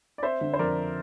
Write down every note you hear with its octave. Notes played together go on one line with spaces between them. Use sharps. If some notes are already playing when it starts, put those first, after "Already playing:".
D5
C4 C5 E5
D3
C5
F2 A#4 D5